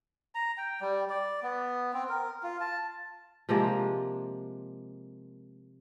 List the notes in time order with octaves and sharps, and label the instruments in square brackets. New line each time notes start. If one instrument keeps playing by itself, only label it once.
[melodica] A#5
G5
G3
D5
B3
C4
A#4
F4
A5
[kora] C3 F3 G#3 A#3